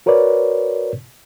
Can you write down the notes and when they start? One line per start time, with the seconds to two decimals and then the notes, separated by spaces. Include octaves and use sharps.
0.06 F#4 A#4 B4 C#5 D5